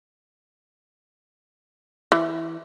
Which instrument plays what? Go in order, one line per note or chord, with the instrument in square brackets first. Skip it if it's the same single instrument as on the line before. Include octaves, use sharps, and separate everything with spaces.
[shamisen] E3